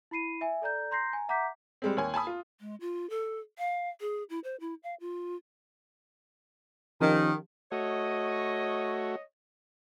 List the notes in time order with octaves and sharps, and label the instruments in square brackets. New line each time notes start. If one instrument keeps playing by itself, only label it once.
[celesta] E4 B5 C7 D#7
E5 G#5
A4 D5 A#5 G6
A#5 C6 G6 A#6 C7
G#5 A#5
E5 F#5 A#5 D6 G6 B6
[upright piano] G3 G#3 C4
D#2 C#5 G#5
G#5 A5 B5 D#6
F4
[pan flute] G#3
F4
A4
F5
G#4
E4
C5
E4
F5
F4
[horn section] D#3 [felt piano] F3 C#4 G4
[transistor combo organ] A3 F#4 [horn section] C#5 D#5